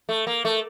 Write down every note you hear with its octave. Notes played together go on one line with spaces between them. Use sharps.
A3
A#3
A3